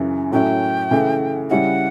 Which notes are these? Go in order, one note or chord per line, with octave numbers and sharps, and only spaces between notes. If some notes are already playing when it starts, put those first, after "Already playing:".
Already playing: F#2 C#3 E3
A2 F#3 C#4 E4 G5
C#3 E3 A3
C#3 G3 C#4 E4 F#5